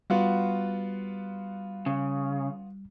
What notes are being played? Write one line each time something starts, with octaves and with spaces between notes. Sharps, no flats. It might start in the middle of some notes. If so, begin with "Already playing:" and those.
G3 B3 F4 F#4
C#3